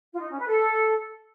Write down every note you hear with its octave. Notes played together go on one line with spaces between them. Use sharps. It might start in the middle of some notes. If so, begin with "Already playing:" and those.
F4
D#4
C#4
B4
A4